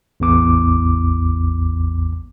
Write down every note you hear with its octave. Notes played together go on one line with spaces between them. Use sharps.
A1 E2 D6